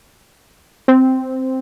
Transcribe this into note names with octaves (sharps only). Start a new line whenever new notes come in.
C4